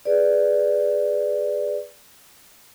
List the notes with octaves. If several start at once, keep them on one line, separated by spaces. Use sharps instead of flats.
G#4 B4 D5